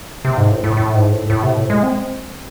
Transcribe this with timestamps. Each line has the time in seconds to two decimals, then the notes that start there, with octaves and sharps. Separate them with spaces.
0.25 C3
0.37 G#2
0.51 A2
0.64 A2
0.77 A2
0.95 G#2
1.12 A2
1.30 A2
1.43 C3
1.57 A2
1.70 G#3
1.83 C4